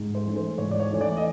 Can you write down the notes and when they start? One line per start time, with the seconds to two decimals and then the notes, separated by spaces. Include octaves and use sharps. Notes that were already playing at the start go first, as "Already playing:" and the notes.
Already playing: G#2
0.15 C5
0.26 E3 A3
0.36 C5
0.58 G#2 C#5
0.71 D5
0.80 C#5
0.91 E3 A3
1.01 D5
1.17 D#5